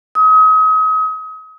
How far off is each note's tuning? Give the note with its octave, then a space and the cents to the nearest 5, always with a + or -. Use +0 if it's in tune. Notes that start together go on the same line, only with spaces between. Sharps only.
D#6 +35